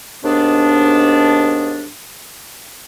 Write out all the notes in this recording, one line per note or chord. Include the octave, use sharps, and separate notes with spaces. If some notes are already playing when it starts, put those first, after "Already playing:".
D#2 G#2 B3 D4